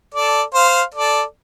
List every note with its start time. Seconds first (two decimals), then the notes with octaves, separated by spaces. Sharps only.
0.14 A4 D5
0.54 C5 F5
0.94 A4 D5